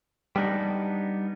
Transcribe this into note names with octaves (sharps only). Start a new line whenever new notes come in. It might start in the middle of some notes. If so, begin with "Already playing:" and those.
G3 B3 D4 D#4